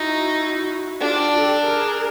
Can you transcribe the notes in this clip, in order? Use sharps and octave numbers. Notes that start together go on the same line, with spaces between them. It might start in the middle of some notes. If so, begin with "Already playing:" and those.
Already playing: D#4 E4 F#4
D4 F4 G4
G4 A4
G#4 A#4